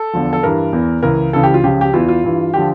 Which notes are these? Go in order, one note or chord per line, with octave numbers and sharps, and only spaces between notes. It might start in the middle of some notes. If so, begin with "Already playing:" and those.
Already playing: A4
E2 D3 F3
A4
G2 E3 A#4
E2 E3
C#2 C#3 E3 A#4
C#2 C#3 E3 A4
G4
F4
C#2 C#3 F3 G4
G4
E2 E3 F4
F4
G2 E3
D3 F3 G4